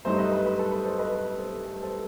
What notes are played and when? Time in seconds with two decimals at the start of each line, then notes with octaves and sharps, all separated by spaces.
0.05 G2 F#3 A3 D#4 C5 E5
0.18 B4 D#5
0.33 B4
0.46 B4
0.59 A4
0.71 B4
0.85 A4 C5
0.99 B4 D#5
1.12 B4
1.38 A4 C5
1.66 A4
1.83 A4 C5